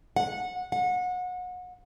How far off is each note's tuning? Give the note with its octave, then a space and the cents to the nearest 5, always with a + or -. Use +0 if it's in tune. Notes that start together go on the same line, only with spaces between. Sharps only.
F#5 -20
F#5 -30